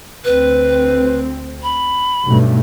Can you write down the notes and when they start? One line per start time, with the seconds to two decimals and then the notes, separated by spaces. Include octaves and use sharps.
0.25 D2 C4 B4
1.63 B5
2.26 B1 G2 A3